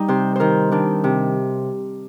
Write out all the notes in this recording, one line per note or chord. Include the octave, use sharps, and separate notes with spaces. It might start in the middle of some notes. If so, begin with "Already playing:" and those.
Already playing: G3 D#4
C3 C5
D#3 A#4 C5
D#3 D4
C3